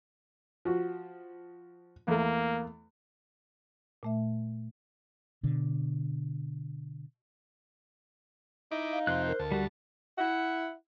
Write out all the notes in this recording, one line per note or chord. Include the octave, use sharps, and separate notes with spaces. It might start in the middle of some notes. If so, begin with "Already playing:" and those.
F3 F#4
E2 A3 A#3
A#2 A3 E5
B2 D3
D#4 E4 D#5 D6
F5
F2 C3 F3 C5 F#6
A#4
D2 A5
G3 F#4
E4 E5 F#5